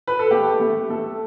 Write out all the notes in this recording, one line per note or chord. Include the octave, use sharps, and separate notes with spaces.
B4
A4
A3 G4
A3
A3 A4